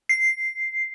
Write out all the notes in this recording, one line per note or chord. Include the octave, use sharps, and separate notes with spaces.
C7